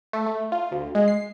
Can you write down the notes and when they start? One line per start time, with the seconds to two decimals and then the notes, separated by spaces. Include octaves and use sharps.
0.13 A3
0.26 A3
0.52 F4
0.72 D2
0.95 G#3
1.08 C7